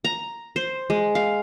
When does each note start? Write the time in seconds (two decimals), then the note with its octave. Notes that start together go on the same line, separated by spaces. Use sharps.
0.04 A#5
0.56 C5
0.90 G#3
1.15 F5